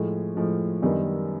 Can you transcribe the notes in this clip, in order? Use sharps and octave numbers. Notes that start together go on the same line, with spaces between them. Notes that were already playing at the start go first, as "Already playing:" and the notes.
Already playing: A2 F3 G#3
A2 F3 G#3
F#2 D#3 G3 B3 D4